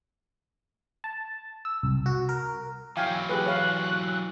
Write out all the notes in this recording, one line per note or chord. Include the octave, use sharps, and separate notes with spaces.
A5
E6
C2
F#4
A#4
E3 F#3 F5 G5 G#5
G4 G#4 B4 F#6
C#5 F5